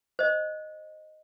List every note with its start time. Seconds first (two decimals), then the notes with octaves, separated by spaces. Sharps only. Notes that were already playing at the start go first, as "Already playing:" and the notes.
0.19 C5 D#5